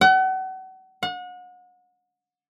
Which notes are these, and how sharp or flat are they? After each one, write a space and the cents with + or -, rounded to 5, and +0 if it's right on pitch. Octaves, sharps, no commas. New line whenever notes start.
F#5 +35
F#5 -35